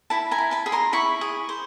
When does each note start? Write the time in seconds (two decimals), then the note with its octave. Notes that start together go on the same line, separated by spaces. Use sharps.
0.10 E4 A5 B5
0.31 G#5 A#5
0.38 E4
0.51 A5 B5
0.66 G#4 B5
0.72 A#5 C6
0.93 E4 B5 C#6
1.21 G#4
1.49 C5